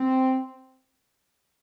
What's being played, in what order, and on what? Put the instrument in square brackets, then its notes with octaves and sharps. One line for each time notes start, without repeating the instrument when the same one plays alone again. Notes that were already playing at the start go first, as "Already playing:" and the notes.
Already playing: [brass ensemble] C4